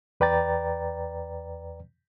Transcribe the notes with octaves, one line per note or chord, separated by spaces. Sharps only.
E2 B4 D5 G5 A#5 A6